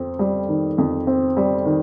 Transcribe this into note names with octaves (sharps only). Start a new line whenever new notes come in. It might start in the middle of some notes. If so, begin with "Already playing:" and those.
Already playing: F2 C4
G3
D#3
F2
C4
G3
D#3